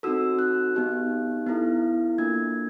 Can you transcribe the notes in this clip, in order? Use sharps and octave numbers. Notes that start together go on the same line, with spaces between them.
C4 D#4 F#4 A4 E6
F#6
B3 D#4 G4
B3 E4 A4
A#3 D4 F4 A4 G#6